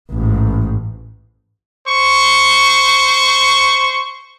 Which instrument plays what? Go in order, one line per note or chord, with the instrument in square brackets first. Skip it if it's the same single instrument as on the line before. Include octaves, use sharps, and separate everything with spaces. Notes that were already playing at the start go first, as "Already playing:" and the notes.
[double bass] A1 G#2
[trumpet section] C5 C#6